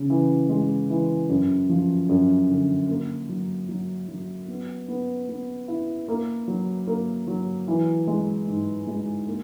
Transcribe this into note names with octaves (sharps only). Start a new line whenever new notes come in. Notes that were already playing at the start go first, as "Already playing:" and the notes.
Already playing: C#3
E3
G#3
E3
F#2
F3
F#2
D3
A#3
F#3
F#3
F#3
B3
B3
B3
E4
A#3
F#3
A#3
F#3
E3
G#3
G#2
G#3
A#3